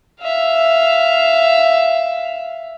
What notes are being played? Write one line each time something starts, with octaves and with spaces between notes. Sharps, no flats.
E5 F5